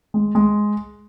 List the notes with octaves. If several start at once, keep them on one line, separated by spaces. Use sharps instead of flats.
G#3
G#3